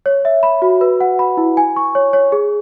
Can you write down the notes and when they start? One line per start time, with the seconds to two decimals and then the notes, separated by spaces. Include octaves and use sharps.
0.06 C#5
0.25 E5
0.43 B5
0.62 F#4
0.81 B4
1.00 F#5
1.19 B5
1.37 E4
1.57 G#5
1.76 C#6
1.95 C#5
2.13 C#5
2.32 G#4